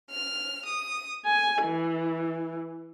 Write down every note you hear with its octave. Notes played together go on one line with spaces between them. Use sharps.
F6
D#6
G#5
E3